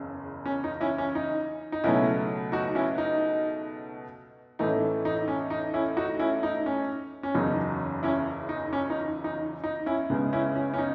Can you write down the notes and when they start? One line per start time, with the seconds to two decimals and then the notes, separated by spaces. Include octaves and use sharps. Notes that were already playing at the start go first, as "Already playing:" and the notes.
Already playing: F#1 E2 C#3
0.46 C#4
0.64 D#4
0.80 C#4 E4
0.98 C#4
1.15 D#4
1.72 D#4
1.84 C#2 B2 F#3 A3 C#4 E4
2.52 D#4 F#4
2.75 C#4 E4
2.98 D#4
4.59 A1 A2 E3 A3 D#4
5.05 D#4
5.28 C#4
5.50 D#4
5.74 C#4 E4
5.97 D#4 F#4
6.19 C#4 E4
6.43 D#4
6.66 C#4
7.23 C#4
7.35 F#1 E2 C#3 F#3 D#4
8.03 C#4 E4
8.49 D#4
8.73 C#4
8.90 D#4
9.24 D#4
9.64 D#4
9.86 C#4 E4
10.10 C#2 C#3 G#3 B3
10.33 C#4 E4
10.56 C#4
10.74 C#4
10.78 D#4